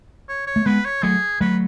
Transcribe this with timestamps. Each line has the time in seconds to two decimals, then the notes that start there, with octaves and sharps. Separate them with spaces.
0.29 C#5
0.47 C#5
0.56 A3
0.66 G#3 B3 B4
0.85 C#5
1.03 F#3 A3 G#4
1.41 F#3 A3 B4